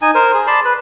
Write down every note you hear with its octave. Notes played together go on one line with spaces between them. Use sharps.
D#4 G#5
A#4 C5
G#4
D5 A5 B5 C6
B4